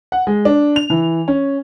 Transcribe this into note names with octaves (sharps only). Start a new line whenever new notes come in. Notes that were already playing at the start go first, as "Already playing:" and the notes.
F#5
G#3
D4
F7
E3
C#4